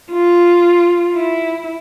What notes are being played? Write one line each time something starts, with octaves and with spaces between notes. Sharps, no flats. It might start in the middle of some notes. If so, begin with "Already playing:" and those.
F4
E4